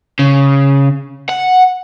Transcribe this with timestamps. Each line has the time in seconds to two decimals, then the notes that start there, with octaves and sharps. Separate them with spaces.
0.19 C#3
1.29 F#5